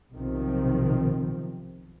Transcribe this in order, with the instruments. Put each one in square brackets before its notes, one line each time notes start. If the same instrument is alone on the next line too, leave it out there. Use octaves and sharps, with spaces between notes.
[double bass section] B1 C3 D#3 F3 C4